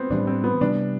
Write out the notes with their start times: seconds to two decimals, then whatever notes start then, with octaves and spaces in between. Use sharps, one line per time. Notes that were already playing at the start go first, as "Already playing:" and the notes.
Already playing: B3 C4
0.10 A2 E3 G3 D4
0.27 C4
0.44 B3
0.61 C3 E3 G3 B3 D4